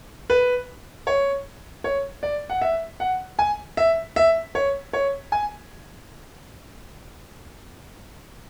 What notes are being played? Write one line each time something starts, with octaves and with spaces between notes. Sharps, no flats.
B4
C#5
C#5
D5
F#5
E5
F#5
G#5
E5
E5
C#5
C#5
G#5